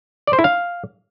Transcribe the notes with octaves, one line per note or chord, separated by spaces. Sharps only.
D5
C5
E4
F5